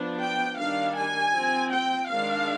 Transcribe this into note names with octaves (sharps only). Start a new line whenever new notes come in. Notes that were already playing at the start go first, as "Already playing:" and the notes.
Already playing: F3 B3 D4
G5
D#3 G3 D4 F5
G#5
F3 C4
G5
D#3 G#3 D4 F5